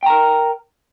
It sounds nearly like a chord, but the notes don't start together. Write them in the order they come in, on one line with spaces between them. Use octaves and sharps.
G5 A#5 A#4